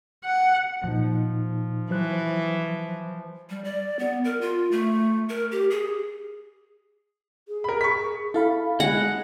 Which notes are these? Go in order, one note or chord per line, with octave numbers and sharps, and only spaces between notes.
F#5
A#2 F3 D#4
E3 F#3 C5 F#6
G3
D5
B3
A#4
F4
A3
A#4
G4
G#4
G#4
A#4 B5
G#4 C#6 B6
G#4
E4 A4 F5 B5
G#3 F#5